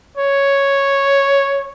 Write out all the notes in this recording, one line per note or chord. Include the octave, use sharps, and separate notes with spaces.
C#5